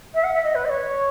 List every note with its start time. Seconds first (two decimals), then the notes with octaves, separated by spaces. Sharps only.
0.14 E5
0.23 F#5
0.34 E5
0.43 D#5
0.54 B4
0.65 D#5
0.69 C#5